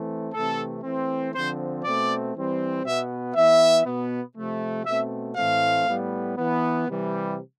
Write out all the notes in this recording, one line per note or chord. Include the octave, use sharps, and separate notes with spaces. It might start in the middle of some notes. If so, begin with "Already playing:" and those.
Already playing: E3 A3 C4
C3 E3 A3 C4 A4
E3 A3 C4
D3 F3 C4 C5
B2 A3 C4 D5
E3 G3 C4
B2 B3 E5
E3 B3 E5
B2 B3
C3 F3 A3
B2 A3 C4 E5
A2 E3 A3 C4 F5
A2 G3 B3
E3 B3
C3 E3 G3